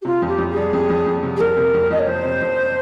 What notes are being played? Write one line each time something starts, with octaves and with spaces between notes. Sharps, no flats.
G4
C3 F4
F2
G4
F2
G#4
G3
F2
F2
F2
C3
G#4
F2 A#4
C3
F2
F2 D#5
C#5
F2 C5
C3
F2